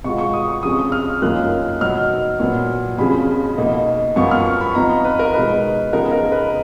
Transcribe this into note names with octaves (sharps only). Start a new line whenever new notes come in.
B2 G#3 B3 F4 C#6
C#6
D#6
C#6
F2 C#3 F3 D#6
F6
F#2 D#3 A#3 C#4 F4 F#6
B2 F#3 B3 D#4 F6
A#2 F#3 B3
F2 C#3 F3 B5
B2 A#3 D#4
F#2 F3 B3 F4 C#6
F6
C#6
B5
F2 F3 B3 D#4 A#5
B4
A#4
B2 G#3 D#4 B4
C#3 F3 B3 D#4 A#4
A#4
B4